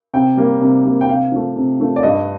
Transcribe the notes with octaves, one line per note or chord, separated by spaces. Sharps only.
C3 G5
G3 A#3
C3
G3 A#3
G5
C3 F5
F3 A3
C3
F3 A3
D5
G2 D#5